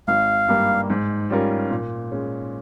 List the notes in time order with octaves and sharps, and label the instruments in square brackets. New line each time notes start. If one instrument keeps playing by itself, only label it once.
[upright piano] G#1 [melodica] F5
[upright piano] G2 G3 A#3
G#2
G3 C#4 F4 A#4
A#2
G#3 C#4